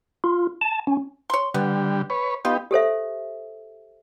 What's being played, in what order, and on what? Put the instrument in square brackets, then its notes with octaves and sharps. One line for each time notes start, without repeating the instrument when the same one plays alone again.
[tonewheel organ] F4
A5
C#4
[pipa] C#5 C6
[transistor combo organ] D3 G3 [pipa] B3
[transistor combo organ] B4 C#5
[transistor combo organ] B3 D#4 G4 [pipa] F4
[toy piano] G4 A4 C5 E5